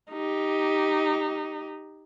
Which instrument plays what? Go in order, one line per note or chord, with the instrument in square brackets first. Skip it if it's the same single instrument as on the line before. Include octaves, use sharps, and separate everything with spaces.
[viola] D#4 G4